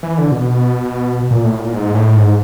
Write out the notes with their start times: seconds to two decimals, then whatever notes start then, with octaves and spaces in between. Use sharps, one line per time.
0.03 E3
0.18 D3
0.32 B2
1.31 A#2
1.44 A2
1.59 A#2
1.73 G#2
1.94 A2
2.16 G#2